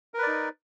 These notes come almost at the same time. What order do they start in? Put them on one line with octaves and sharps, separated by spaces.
A#4 B4 D5 D#4